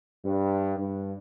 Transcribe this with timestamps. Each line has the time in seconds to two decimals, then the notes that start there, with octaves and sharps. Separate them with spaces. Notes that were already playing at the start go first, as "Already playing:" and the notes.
0.25 G2
0.79 G2